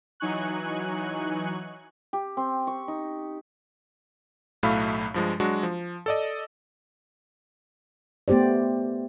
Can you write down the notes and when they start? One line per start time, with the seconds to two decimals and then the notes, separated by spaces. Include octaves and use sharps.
0.20 E3 F#3 D#4 G#5 C#6 F#6
2.13 G4
2.37 C4
2.67 C#6
2.88 D#4
4.63 B1 A2 F#3 A3 F5 B5
5.14 G2 F3 G#3
5.40 F#3 G#3 D4 F#4
5.63 F3
6.06 A4 D5 D#5
8.28 A3 B3 G4 C5 D5